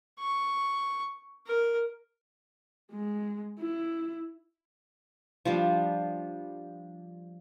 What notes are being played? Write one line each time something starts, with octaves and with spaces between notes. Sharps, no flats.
C#6
A#4
G#3
E4
F3 G3 D4